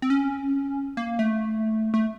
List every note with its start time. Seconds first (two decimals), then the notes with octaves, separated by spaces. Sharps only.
0.02 C4
0.10 C#4
0.97 A#3
1.19 A3
1.94 A3